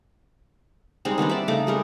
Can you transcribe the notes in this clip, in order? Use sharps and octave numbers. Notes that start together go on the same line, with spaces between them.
G3 G#3 C4 D#4
D#3 B3 C4 D4
D5 E5
C#3 A3 D#4 D6
G3 G#3 A#4